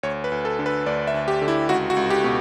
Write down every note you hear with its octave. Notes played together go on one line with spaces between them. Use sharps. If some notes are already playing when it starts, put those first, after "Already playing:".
D2 C#5
B4
D2
A4
D3
B4
D2 D5
E5
D2
G4
D3
E4
C#2 F#4
F#4
C#2
G4
B2